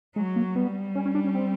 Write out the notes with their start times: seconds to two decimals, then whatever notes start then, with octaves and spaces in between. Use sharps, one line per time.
0.16 F#3 G#3
0.36 A#3
0.56 G3 B3
0.95 C#4
1.06 C#4
1.15 D4
1.25 C#4
1.35 C4